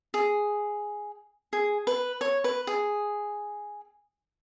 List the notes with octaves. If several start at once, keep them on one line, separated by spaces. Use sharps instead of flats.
G#4
G#4
B4
C#5
B4
G#4